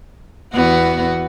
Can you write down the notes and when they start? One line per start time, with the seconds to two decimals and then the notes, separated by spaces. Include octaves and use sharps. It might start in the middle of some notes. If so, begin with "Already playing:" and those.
0.53 E2 B3 F#4